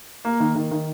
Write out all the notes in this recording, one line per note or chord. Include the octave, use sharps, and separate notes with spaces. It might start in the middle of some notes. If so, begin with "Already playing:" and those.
A#3
D#3
D#3
D#3